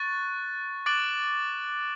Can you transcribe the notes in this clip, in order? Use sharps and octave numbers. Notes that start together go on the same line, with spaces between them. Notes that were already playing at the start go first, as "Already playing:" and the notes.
Already playing: C#6 F#6 A6
D6 F#6 A6 D7 F#7